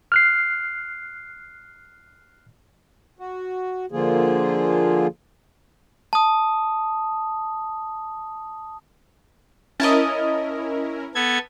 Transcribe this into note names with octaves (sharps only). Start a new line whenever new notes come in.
F6 F#6 C7
F#4
D3 F3 A#3 F4 G#4
A5 D#6
C#4 E4 A#4 D#5 A5
B3 A4 G#6